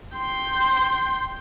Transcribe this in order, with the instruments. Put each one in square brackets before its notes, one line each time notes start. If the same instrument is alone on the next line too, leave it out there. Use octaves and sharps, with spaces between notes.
[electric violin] G5 C6